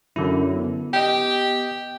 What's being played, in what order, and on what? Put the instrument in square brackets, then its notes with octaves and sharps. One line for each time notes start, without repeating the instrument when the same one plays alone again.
[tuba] F#2 [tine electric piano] D3 E4
[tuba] B3
[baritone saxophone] G4 [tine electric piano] D#5 G5